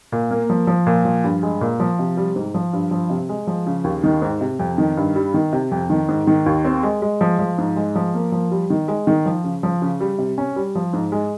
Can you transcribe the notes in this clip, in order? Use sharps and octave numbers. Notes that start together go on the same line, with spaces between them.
A#2
A#3
F3
F3
A#2
F3
G2
G#3
A#2
F3
C3
G3
G#2
F3
G2
F3
C3
G#3
F3
C#3
D#2
D#3
G#2
C3
F2
D#3
G2
G3
D#3
C3
F2
D#3
G#2
D#3
D#2
C4
G#3
G#3
F3
F3
G#2
G#3
F3
A#3
F3
G3
D#3
G#3
D#3
F3
C#3
F3
C#3
G3
C3
C#4
G3
F3
G#2
G#3